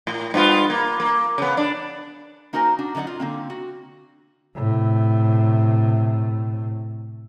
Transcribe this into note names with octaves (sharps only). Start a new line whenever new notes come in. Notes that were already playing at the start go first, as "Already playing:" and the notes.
A2
G2 B3 F4
A#3
A#3
C#3 B3
D4
A#3 D#4 F#4 A#4 C5 G#5
D4 F#4
D3 F#3 D#4 D5 F#5
F4
D3 A#3 C4
F#4
A2 C3